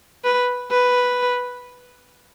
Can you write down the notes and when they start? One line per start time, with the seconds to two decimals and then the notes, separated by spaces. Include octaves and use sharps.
0.24 B4
0.71 B4